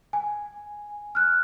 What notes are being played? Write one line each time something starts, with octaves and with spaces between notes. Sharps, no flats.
G#5
F6 F#6